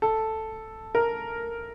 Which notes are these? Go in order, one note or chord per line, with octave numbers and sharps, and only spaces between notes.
A4
A#4